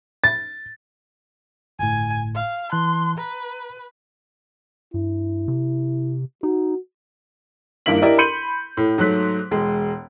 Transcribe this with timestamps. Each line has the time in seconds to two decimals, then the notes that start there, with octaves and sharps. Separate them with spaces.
0.24 A6
1.79 G1 A2 G#5
2.35 F5
2.72 E3 A5 C6 F#6
3.18 B4 A#5
4.94 G2 E4
5.48 C3
6.43 D#4 F#4
7.86 G2 D#3 A#3 E4 B6 F#7
8.02 D4 E4 G4 A#4 D5 D#5
8.18 B5 C6 G6 C#7 D#7 F#7
8.77 A2
8.98 G#2 F#3 A3 F#6 B6
9.51 E1 G#3